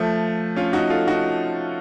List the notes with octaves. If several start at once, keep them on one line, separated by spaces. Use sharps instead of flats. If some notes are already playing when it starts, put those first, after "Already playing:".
Already playing: F3 A3
C#4 F4
D#4 F#4
F4 A4
D#4 F#4